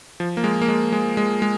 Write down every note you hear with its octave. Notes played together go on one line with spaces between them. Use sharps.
F3
A#3
G#3
A#3
G#3
G#3
G#3
G#3